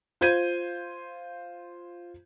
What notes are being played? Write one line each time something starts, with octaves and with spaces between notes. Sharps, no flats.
F4 C5 G6 G#6 D#7